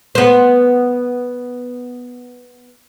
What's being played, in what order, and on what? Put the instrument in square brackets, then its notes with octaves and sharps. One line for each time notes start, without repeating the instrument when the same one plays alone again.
[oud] B3 C5